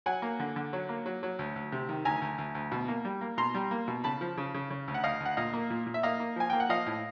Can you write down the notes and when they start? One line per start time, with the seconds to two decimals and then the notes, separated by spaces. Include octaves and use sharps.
0.06 F#3 F#5 G#5
0.22 A#3
0.40 D3
0.56 D3
0.73 F#3
0.89 A#3
1.06 F#3
1.23 F#3
1.39 D2
1.56 D2
1.72 C3
1.89 D#3
2.05 D2 G#5 A#5
2.22 D2
2.38 D2
2.55 D2
2.72 B2
2.88 A#3
3.05 G3
3.21 A#3
3.37 B2 A#5 C6
3.55 G3
3.71 A#3
3.88 B2
4.04 C#3 A5 B5
4.21 F3
4.37 C#3
4.54 C#3
4.70 C#3
4.88 D2
4.94 F#5
5.04 D2 D#5 F5
5.20 D2
5.25 F#5
5.37 A#2 D#5 F5
5.53 A#3
5.70 A#2
5.86 A#2
5.94 E5
6.03 A#3 D#5 F5
6.20 A#3
6.36 F3 G#5
6.50 A#3 G5
6.60 F#5
6.69 F3 D#5 F5
6.86 A2